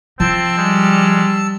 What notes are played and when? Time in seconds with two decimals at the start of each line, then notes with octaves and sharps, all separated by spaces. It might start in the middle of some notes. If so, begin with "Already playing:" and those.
0.20 F3 C4 A5 E6
0.58 G3 G#3